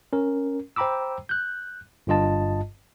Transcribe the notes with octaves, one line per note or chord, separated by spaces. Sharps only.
C#4 A#4
C5 G5 A#5 B5 D6 E6
F#6 G6
G1 G2 F4 D#5 A5